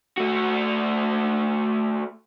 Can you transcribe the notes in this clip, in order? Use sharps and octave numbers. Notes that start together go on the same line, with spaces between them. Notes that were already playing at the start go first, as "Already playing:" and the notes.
A3 F#4